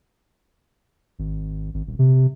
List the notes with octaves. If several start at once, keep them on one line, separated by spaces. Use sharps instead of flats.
G#1
G#1
D#1
C3